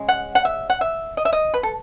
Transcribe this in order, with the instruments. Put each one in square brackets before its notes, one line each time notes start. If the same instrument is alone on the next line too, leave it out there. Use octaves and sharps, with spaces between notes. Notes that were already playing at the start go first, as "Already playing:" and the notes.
Already playing: [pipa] C#3 G#3
F#5
F#5
E5
F#5
E5
D#5
E5
D#5
B4
A4